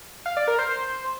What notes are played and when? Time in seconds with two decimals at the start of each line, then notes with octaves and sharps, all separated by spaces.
0.26 F5
0.37 D5
0.48 A#4
0.59 C5